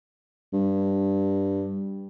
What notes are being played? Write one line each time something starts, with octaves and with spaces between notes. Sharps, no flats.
G2